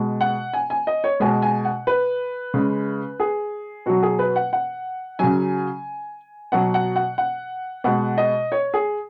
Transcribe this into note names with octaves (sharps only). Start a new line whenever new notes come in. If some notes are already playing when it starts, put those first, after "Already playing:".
Already playing: B2 G#3
F#5
G#5
G#5
D#5
C#5
B2 G#3 G#5
G#5
F#5
B4
C#3 G#3
G#4
B2 F#3 F#4
G#4
B4
F#5
F#5
C#3 F#3 G#5
B2 F#3 F#5
F#5
F#5
F#5
B2 G#3 F#5
D#5
C#5
G#4